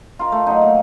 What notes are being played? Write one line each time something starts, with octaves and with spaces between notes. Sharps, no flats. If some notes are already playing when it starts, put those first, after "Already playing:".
F4 A#4
A3
F#3 D#4
A#3